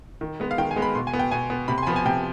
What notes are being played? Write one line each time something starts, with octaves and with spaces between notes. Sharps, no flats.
D#3
G#3 B3
F5
D#3 G5
G#5
G#3 B3
B5
B2 C6
G#5
B3
G5
B2 G#5
B3
C3 B5
C6
G#5
F3 B3 B5
G#5
C3 G5